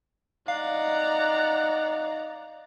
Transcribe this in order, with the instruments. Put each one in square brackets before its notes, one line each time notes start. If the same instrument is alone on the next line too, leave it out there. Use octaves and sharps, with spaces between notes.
[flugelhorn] D#4 [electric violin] D5 A#5 [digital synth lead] F5 [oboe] F#5